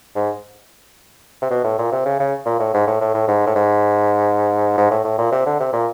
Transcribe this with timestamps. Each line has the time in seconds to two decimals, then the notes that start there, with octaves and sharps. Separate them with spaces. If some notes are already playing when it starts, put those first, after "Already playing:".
0.15 G#2
1.42 C3
1.50 B2
1.64 A2
1.79 A#2
1.92 C3
2.06 C#3
2.20 C#3
2.46 A#2
2.60 A2
2.74 G#2
2.87 A2
3.00 A2
3.14 A2
3.28 G#2
3.47 A2
3.55 G#2
4.78 G#2
4.91 A2
5.04 A2
5.18 A#2
5.32 C3
5.46 D3
5.60 C3
5.73 A#2